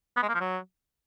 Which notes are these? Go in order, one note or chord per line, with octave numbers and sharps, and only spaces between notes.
B3
G#3
A#3
F3
F#3